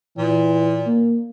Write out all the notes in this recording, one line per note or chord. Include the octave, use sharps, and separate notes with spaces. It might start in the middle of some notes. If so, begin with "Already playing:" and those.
A#2 E3
A#3